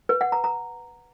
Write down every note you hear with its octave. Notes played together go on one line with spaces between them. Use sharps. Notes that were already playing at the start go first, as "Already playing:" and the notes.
B4
F#5
A#5
A#5